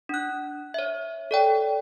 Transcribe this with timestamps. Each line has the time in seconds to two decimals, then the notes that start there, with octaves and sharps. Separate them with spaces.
0.09 D4 F#6
0.74 C#5 E5
1.31 A4 D5 G5